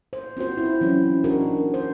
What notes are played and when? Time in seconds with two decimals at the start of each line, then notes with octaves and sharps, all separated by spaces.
0.13 C5
0.37 C4 F4 F#4 C5
0.57 E4
0.81 E3 F#3 C4 C#4
1.24 D4 D#4 F#4 G#4 A#4
1.74 C5